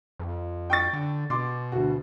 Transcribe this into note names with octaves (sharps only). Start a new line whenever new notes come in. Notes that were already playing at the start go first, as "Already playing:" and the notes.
F2
G5 C#6 A6
D3
B2 C6 D6
D2 F#4